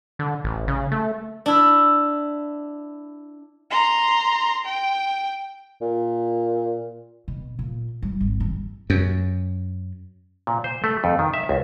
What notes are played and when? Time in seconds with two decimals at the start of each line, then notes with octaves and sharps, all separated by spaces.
0.19 D3
0.44 A1
0.68 C#3
0.92 A3
1.46 D4 E4
3.71 A#5 C6
4.65 G5
5.82 A#2
7.28 B2
7.59 A#2
8.02 G3 D#4
8.21 G#1
8.40 G2 E3
8.90 F#2
10.47 A#2
10.64 C5
10.84 A3
11.04 F2
11.19 D#3
11.34 E5
11.49 C#2